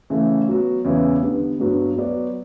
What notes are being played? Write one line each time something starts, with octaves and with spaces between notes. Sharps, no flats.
C#3 E3 A3 C#4
F#3 B3 F#4
E2 C#3 E3 B3 E4
D3 G3 B3
G2 F#3 B3 F#4
F#3 B3 F#4 B4 D5